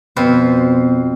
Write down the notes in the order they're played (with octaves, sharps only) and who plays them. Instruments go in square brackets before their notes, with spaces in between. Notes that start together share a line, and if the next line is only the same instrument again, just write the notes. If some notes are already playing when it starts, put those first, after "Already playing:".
[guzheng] F2 B4 C5 [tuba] B2